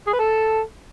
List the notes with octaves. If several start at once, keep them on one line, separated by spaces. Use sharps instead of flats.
G#4
B4
A4